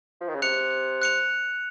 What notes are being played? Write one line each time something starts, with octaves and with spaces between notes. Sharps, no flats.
F3
D#3
C#3
C3 F#6 C#7 F7
F#6 C#7 F7